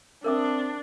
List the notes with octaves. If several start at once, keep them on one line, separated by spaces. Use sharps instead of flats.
C4 D4 A#4 E5 D#6